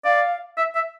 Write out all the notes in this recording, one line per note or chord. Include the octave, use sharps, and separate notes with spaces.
D5 F5
E5
E5